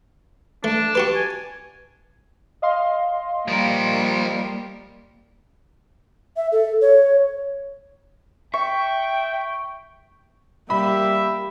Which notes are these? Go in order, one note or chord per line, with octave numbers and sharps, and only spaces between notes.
A3 D4
F#4 G4 B4
G#5
D#5 F5 C6
F3 G3 A#3 A#4
E5
A4
C#5
E5 G5 C#6
G3 A#3 G4 E5 B5